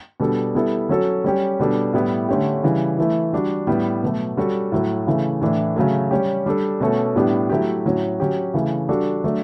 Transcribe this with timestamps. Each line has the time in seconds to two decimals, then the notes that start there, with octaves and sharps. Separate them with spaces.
0.20 B2 G3 D4 A4
0.55 G3 B3 E4 A4
0.89 F#3 C#4 F#4 A4
1.24 G3 C#4 G4
1.59 B2 G3 D4 A4
1.93 A2 G3 B3 E4
2.28 D3 A3 C#4 G4
2.63 C#3 E3 G3
2.98 E3 A3 E4
3.33 G3 D4 F#4
3.67 A2 G3 B3
4.03 B2 F#3 A3
4.37 G3 C#4 F#4 A4
4.72 A2 F#3 A3
5.07 C#3 E3 A3
5.41 A2 E3 A3 D4
5.77 C#3 F#3 A3
6.11 G3 C#4 G4
6.46 G3 D4 A4
6.80 B2 A3 C#4 F#4 A4
7.16 A2 G3 B3 D4 G4
7.49 F#3 A3 E4 G4
7.85 A2 F#3 C#4
8.20 F#3 C#4 G4
8.54 C#3 E3 A3
8.89 G3 D4 F#4 A4
9.24 F#3 A3 D4